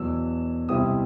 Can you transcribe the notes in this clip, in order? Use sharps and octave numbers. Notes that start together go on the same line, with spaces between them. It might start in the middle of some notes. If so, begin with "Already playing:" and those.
Already playing: E2 B2 F#3 E6
C2 B2 G3 C4 E4 D#6